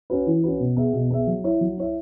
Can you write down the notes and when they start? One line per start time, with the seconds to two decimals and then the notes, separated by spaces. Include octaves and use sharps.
0.10 C#4 F#4 B4
0.27 E3
0.44 C#4 F#4 B4
0.60 B2
0.77 B3 G#4 E5
0.93 B2
1.11 B3 G#4 E5
1.27 F#3
1.44 E4 C#5 E5
1.61 F#3
1.78 E4 C#5 E5